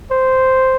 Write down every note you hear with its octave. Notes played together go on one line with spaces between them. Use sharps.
C5